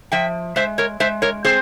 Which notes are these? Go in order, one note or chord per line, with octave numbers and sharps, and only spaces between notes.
F3 E5 G5
G#3 C5 E5
A#4 C#5
G#3 C5 E5
A#4 C#5
C4 G#4 C5